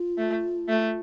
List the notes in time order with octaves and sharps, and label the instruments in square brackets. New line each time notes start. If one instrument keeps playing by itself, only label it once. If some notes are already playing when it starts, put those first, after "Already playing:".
Already playing: [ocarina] F4
[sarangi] A3
A3